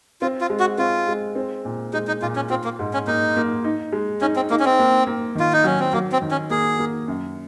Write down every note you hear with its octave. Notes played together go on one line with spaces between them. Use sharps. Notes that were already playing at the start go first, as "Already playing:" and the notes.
C4 F4
F4
G#3
F#4
C4 F4
G#3
C4
A#2
G#3 D#4
D#4
A#2 F4
C#4
C4 F4
A#3
G#2
C#4
A#3 D#4
A#3
D#4
G#3
C#4 D#4
C4
A#3 D#4
C#4
C4
A#3
A#3
D#3 F4
D#4
F#3 C#4
C4
F#3 A#3
C4
D#3
C#4
A#3 G#4
A#3
F#2